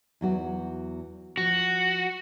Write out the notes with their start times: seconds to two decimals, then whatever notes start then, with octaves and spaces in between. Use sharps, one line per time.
0.21 E2 F#3 F#4
1.37 F3 F#4